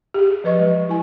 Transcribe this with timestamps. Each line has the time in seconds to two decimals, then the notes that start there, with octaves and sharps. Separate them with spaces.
0.14 G4 G#4
0.44 F3 B4 D#5 C#6
0.59 F#3 G#3
0.89 E4 G#5